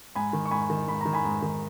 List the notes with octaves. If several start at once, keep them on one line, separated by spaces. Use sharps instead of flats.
G#2 G#5 B5
D#3
C#6
G#2 G#5 B5
D#3
G#2 B5
D#3 A#5
G#5 B5
G#2
D#3